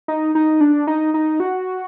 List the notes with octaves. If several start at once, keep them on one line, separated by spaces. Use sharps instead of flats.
D#4
D#4
D4
D#4
D#4
F#4